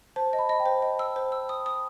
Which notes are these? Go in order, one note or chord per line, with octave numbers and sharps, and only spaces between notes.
C5 A5
D#5
B5
D#5
G5
C5
D#5
E6
C5
E6
D#6
D#6